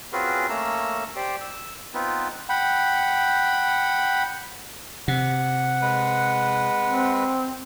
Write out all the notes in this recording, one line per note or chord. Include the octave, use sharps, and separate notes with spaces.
C4 C#4 F4 F#4 G#4 B4
A3 A#3 C#4 A#5 E6
G4 C5 D5 G5
E6
B3 C4 D#4 F4 B4
F#5 G5 B5
C3 F#5
G#3 B4
C4